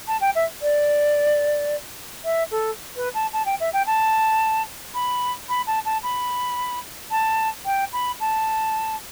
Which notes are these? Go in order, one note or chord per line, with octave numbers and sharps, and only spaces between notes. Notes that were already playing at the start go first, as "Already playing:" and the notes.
A5
G5
E5
D5
E5
A4
B4
A5
A5
G5
E5
G5
A5
B5
B5
A5
A5
B5
A5
G5
B5
A5